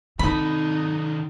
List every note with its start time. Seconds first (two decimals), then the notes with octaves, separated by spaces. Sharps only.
0.19 D#3 C4 D#4 A4 B5